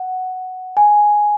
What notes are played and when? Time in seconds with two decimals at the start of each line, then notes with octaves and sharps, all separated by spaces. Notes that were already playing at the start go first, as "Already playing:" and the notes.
Already playing: F#5
0.77 G#5